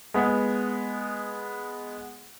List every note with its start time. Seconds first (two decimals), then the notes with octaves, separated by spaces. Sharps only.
0.14 G#3 B3